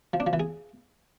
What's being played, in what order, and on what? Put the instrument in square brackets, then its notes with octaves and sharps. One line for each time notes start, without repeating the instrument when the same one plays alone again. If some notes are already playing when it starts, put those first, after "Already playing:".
[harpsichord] F3
D4
F3
E3
G#4